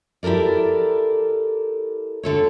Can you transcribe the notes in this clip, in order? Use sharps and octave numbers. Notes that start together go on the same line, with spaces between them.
E4 G4 A4 A#4 D5
D3 A4 C#5